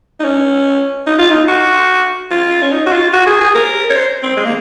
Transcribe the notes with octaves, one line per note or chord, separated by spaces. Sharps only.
D#4
C#4
D#4
F4
D#4
F#4
F4
C#4
D#4
F#4
F4
F#4
G#4
G#4
A#4
C#5
C5
C4
G#3
A#3